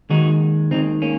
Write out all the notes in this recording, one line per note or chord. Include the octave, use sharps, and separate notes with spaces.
D#2 D#3 G#3 D#4 F#4
D#2 D#3 G#3 C4 D#4
A#3 C#4